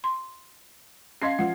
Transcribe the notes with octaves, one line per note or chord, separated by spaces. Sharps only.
C6
C#4 D#5 F5 C6 G#6 C7
F3 F#5